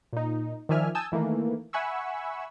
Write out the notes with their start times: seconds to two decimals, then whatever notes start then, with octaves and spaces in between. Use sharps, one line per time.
0.13 A#2 D#4
0.69 D#3 F3 D5 E5 G#5 F6
0.95 G#5 A5 D#6 E6 G6
1.12 D#3 E3 A3 A#3
1.73 E5 F#5 G#5 B5 C#6 E6